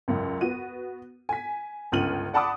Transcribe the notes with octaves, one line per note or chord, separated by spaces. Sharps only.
C#2 F#2
B3 F#4 D#7
G#5 B6
G1 C#2 C#4 F6 D#7 F#7
D5 F#5 A5 B5 D6 D#6